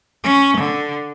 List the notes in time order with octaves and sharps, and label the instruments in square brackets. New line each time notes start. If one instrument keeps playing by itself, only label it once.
[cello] C#4
D3